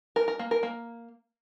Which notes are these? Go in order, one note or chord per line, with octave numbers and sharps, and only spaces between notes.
A#4
A#4
A#3
A#4
A#3